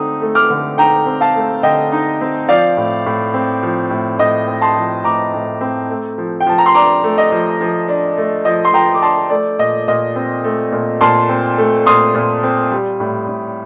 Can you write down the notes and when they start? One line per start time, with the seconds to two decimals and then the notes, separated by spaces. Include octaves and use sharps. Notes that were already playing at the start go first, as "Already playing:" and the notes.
Already playing: D3 A3 C4 D#4 D#6
0.21 A3
0.35 D6 F6
0.50 D3
0.78 D#4 G5 A#5
1.06 C4
1.21 F5 A5
1.36 A3
1.63 D3 D#5 G5
1.92 D#4
2.21 C4
2.49 F3 D5 F5
2.77 A2
3.06 A2
3.34 C4
3.63 F3
3.90 A2
4.19 A2 D#5
4.47 C4
4.61 A5 C6
4.77 F3
5.04 A2 A#5 D6
5.34 A2
5.61 C4
5.90 A3
6.18 F3
6.40 G5
6.46 F3 A5
6.58 A#5
6.66 C6
6.75 D4 A#5 D6
7.04 A3
7.18 D#5
7.32 F3
7.61 F3
7.88 D4
8.18 A3
8.45 F3 D#5
8.65 C6
8.73 F3 G5 A#5
8.95 D6
9.02 D4 A5 C6
9.30 A3 D5
9.59 A#2 D#5
9.88 A#2 D#5
10.16 C4
10.44 A3
10.72 A#2
11.01 A#2 A5 C6
11.29 C4
11.58 A3
11.86 A#2 C6 D#6
12.15 A#2
12.43 C4
12.71 G3
13.00 A2
13.28 A2